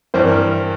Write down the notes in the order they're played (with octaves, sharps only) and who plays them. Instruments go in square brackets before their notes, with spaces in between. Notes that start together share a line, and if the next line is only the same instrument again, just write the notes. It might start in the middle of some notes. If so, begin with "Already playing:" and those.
[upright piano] G2 E3 G3 [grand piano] C5
[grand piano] A#4